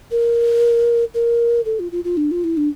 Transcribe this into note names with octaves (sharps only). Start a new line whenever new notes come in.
A#4
A#4
A4
F4
F4
F4
D4
F4
E4
D4